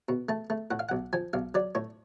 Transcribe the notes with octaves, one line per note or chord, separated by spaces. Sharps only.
B2
A3 A5
A3
A2 F#5
F5
B1 F#5
F3 G#5
B1 F5
F#3 D5
A2 C#5